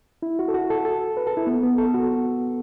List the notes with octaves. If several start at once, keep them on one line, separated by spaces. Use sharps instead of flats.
E4
F#4
A4
F#4
A4
A4
B4
A4
E4
B3
B3
A4
F#4